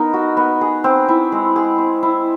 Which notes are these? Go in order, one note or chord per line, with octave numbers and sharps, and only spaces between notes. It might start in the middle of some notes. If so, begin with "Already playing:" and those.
Already playing: B3 D#4 A#4
F#4
B3
G#4
C4
E4
G#3
G#4
C4
E4